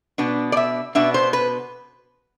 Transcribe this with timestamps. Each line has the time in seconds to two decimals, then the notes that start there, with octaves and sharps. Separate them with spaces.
0.18 B2 B3 D4
0.52 D5
0.57 E5
0.95 B2 B3 D4 E5
1.14 C5
1.33 B4